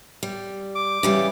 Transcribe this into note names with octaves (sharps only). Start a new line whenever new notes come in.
G3
D6
C#3 E3 G3